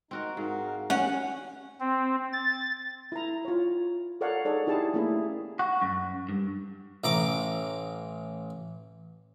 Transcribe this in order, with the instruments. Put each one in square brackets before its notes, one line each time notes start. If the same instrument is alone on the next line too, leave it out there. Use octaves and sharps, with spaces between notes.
[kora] C4 F#4 A#4 [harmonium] D#4
[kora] G#2 [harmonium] F#4 A#4 F5
[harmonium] G3 F#4 G#4 [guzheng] C#4 [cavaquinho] F#5
[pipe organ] C4
A6
[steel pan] E4 A#5
F4 C#5
A4 A#4 C#5 D5 F5 F#5
D#4 G#4 A4 C#5 D5
D#4 E4 G4 G#4 A5
A3 A#3 C#4 E4 G#4
[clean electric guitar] F#4
F#2
G2
[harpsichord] A1 A#5 D6